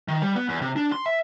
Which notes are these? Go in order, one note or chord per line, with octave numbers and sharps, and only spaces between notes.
D#3
G3
B3
E2
C3
D4
C6
E5